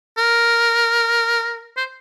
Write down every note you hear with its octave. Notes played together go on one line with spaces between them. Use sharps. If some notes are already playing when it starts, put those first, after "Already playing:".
A#4
C5